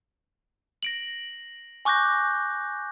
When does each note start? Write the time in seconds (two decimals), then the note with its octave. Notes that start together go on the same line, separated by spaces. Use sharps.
0.83 A#6 D7 F#7
1.85 G#5 C#6 D6 F#6 G6 A#6